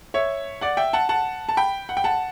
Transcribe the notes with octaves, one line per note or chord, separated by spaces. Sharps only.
C#5 E5
D5 F#5
E5 G5
F#5 A5
F#5 A5
A5
G5 B5
F#5
G5
F#5 A5